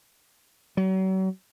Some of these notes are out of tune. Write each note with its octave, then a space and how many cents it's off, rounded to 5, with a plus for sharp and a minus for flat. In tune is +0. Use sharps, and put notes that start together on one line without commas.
F#3 +40